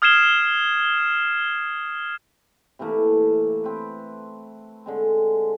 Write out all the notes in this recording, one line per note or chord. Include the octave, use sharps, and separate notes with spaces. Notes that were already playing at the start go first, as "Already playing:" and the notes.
D#6 F6 G#6 C7 E7 G7
C3 E3 A3 A#3
C4 B4
D3 G#3 C4